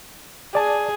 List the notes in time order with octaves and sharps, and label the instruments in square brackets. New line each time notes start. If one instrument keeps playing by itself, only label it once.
[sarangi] G#4 [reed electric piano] D5 A5